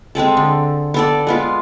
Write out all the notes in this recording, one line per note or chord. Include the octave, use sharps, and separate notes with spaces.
G#3 C4 G#4 A4
D3
B3 A4 D5
G#3 B3 F4